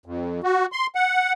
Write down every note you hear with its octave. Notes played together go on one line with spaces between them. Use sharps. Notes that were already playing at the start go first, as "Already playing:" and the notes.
F2
F#4
C6
F#5